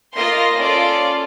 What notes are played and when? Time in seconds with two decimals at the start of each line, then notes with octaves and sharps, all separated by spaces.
0.17 A#3 F4 D#5 C6 A#6
0.60 C#4 F4 A4 D5